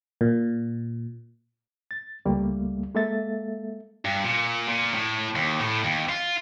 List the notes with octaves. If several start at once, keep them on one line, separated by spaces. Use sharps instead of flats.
A#2
A6
C#2 G3 A3 A#3
G#3 A#3 A4 E5 A6
G2
A#2
A#2
A2
D#2
A2
D#2
F4